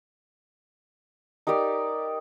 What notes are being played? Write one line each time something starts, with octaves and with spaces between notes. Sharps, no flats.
D#4 G4 A#4 D5